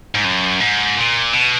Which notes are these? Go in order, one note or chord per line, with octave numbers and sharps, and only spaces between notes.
G#2
F#2
G#2
A#2
B2